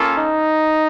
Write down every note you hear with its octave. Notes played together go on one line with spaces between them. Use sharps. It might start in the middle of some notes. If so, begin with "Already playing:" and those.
Already playing: A#3 C#4 F4 A4
D#4